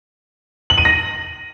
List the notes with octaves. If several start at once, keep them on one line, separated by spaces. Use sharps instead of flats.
F#7
D#7
A#6